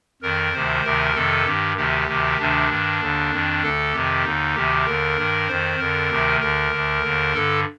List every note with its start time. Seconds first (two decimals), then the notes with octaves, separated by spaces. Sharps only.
0.22 F2 D#3 A#4
0.54 D2 C3 D#3 C5
0.84 D2 C3 D#3 A#4
1.15 F2 C3 D#3 A4
1.46 G2 D#3 G4
1.77 D2 C3 D#3 G4
2.08 D2 C3 D#3
2.39 D2 C3 D#3 D4
2.69 G2 D#3
3.00 D#2 D3
3.32 F2 D#3
3.62 D2 D3 A4
3.93 F2 C3 D#3 G4
4.24 D#2 D3 D#4
4.55 D2 C3 D#3 G4
4.86 D#2 D3 A#4
5.17 G2 D#3
5.48 F2 D#3 C5
5.79 F2 D3 A#4
6.10 D2 C3 D#3
6.40 D2 D3 A#4
6.72 D2 D3
7.03 D#2 D3
7.34 G2 D3 A4